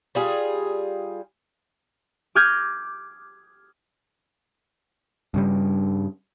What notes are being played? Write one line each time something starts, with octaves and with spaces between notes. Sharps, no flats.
G3 F4 G#4
D6 D#6 F6 G6 G#6 A#6
G2 C#3 G3